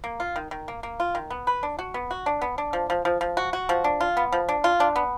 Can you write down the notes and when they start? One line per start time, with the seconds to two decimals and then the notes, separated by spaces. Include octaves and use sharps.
0.04 A#3
0.20 F4
0.36 D#3
0.51 D#3
0.68 A#3
0.83 A#3
1.00 F4
1.15 D#3
1.30 B3
1.47 B4
1.63 D4
1.79 F#4
1.94 B3
2.11 F#4
2.26 D4
2.42 B3
2.58 D4
2.73 F3
2.90 F3
3.05 F3
3.21 F3
3.37 F#4
3.53 F#4
3.69 F3
3.84 D4
4.01 F4
4.17 B3
4.32 F3
4.49 D4
4.64 F4
4.80 D4
4.96 B3